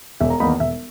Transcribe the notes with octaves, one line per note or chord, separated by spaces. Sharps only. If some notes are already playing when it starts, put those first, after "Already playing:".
E1 E5
A#5
E2 D#3 A#3 D#4 B5
E1 E5